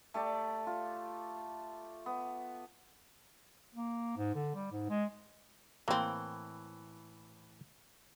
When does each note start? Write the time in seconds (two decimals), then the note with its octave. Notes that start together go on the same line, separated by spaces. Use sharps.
0.14 A3 G4 D5
0.67 F4
2.06 B3
3.75 A#3
4.17 G#2
4.35 D3
4.56 G3
4.72 G#2
4.89 G#3
5.88 A2 E3 A#3 C4